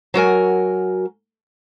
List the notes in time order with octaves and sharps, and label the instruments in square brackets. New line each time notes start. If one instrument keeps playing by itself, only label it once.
[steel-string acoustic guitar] F#3 F#4 A#4 G#5